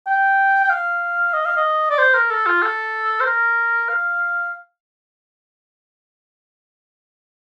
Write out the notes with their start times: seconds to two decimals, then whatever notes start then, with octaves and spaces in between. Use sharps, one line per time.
0.07 G5
0.64 G5
0.70 F5
1.34 D#5
1.46 F5
1.57 D#5
1.90 D5
1.98 C5
2.14 A#4
2.30 A4
2.46 F4
2.62 A4
3.21 C5
3.26 A#4
3.89 F5